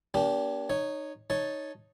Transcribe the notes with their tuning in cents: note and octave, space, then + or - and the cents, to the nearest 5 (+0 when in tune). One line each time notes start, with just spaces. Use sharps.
A#3 +40 D4 -35 G4 +0
D#4 -20 C#5 +0
D#4 +0 C#5 +0 A5 +0